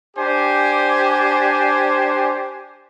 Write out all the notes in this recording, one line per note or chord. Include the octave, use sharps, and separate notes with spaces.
D4 G4 C5 G#5